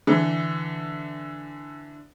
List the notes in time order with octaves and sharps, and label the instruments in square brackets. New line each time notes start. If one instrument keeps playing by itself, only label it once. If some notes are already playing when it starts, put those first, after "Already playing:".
[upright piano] D3 E3